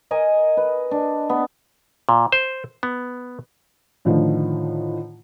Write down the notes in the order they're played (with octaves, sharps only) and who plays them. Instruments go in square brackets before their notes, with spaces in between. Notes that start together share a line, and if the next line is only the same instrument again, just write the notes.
[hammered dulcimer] A#4 D#5 G#5
B4
D4
B3
[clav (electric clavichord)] A#2
C5
B3
[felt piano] A2 D3 D#3 F3